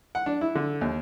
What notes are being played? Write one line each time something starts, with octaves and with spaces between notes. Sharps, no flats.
F#5
D4
E4
D3
D#2